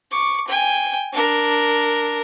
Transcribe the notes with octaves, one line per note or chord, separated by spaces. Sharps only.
C#6 D6
G5 G#5
D4 A#4